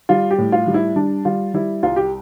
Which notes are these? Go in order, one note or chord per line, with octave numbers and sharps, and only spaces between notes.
G3 F4
G4
A2
F4
G3
E4
G3 D4
G3 F4
G3 E4
C2 F4
G4